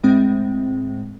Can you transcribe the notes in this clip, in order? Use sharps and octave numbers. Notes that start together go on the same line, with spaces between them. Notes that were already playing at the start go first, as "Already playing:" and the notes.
A2 G#3 C4